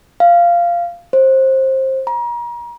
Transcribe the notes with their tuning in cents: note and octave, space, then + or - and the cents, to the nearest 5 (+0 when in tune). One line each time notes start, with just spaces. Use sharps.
F5 -10
C5 +20
A#5 +35